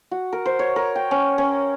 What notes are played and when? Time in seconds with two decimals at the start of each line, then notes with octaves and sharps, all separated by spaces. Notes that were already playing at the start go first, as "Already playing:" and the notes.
0.11 F#4
0.33 A#4
0.46 C5
0.59 C#5
0.76 A#4
0.95 G5
1.11 C#4
1.38 C#4